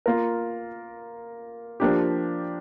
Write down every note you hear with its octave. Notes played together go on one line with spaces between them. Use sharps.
A#3 F4 A#4
F3 A#3 D4 G4